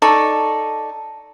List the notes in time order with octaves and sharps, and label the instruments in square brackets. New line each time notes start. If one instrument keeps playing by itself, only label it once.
[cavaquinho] D#4 A4 D5 C#6